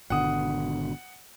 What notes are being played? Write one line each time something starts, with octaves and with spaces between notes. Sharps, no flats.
G#1 B2 D3 F#5 D#6